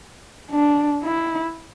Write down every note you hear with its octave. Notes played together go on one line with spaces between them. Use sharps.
D4
E4